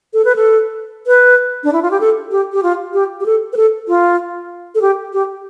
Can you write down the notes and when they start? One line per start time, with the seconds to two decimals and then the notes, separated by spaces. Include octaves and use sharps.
0.14 A4
0.25 B4
0.36 A4
1.07 B4
1.64 D4
1.73 E4
1.82 F4
1.91 G4
2.00 A4
2.32 G4
2.53 G4
2.63 F4
2.94 G4
3.20 G4
3.26 A4
3.53 B4
3.57 A4
3.88 F4
4.75 A4
4.82 G4
5.13 G4